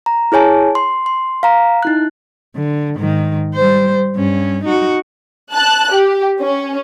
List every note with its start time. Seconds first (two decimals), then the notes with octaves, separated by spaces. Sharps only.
0.06 A#5
0.32 E4 G#4 C#5 G#5 A5
0.75 C6
1.06 C6
1.43 F5 A#5
1.83 D#4 E4 F#6
2.55 D3
2.96 G#2 D#3
3.55 G3 C5
4.16 G2 C#4
4.64 D#4 F#4
5.53 A5 F#6
5.92 G4
6.40 C#4